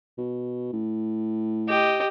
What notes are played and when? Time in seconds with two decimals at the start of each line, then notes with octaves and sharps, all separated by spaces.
0.18 B2
0.73 A2
1.68 G4 D#5